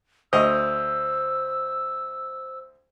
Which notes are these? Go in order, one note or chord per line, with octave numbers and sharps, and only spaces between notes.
D2 C5 D#5 E6